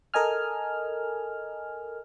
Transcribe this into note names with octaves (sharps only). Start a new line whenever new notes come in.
A4 A#4 D#5 G#5 F6